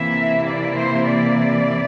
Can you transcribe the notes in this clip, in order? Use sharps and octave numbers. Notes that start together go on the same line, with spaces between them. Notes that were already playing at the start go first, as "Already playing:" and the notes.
Already playing: C3 E3 A#3 E4 E5
D5
C5
D5